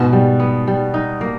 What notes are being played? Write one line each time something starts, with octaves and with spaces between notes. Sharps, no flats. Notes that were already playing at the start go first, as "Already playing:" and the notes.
Already playing: G#2 B2
G3
B3
G3
D#4
A#3